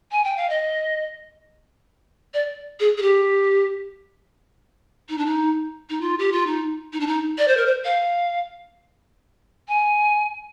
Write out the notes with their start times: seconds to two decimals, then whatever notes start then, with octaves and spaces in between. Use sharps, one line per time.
0.12 G#5
0.24 G5
0.37 F5
0.50 D#5
2.34 D5
2.80 G#4
2.98 G#4
3.02 G4
5.09 D#4
5.18 D4
5.26 D#4
5.90 D#4
6.01 F4
6.19 G4
6.32 F4
6.47 D#4
6.93 D#4
7.00 D4
7.07 D#4
7.38 D5
7.48 C5
7.57 A#4
7.66 C5
7.85 F5
9.68 G#5